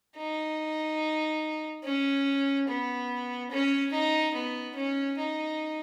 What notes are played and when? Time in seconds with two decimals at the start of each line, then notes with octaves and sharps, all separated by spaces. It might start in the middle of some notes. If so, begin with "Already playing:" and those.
0.16 D#4
1.84 C#4
2.67 B3
3.51 C#4
3.92 D#4
4.34 B3
4.75 C#4
5.18 D#4